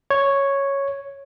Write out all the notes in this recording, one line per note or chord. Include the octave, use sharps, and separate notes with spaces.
C#5